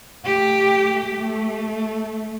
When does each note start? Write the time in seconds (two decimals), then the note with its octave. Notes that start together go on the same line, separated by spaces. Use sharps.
0.24 A3 G4
1.18 A3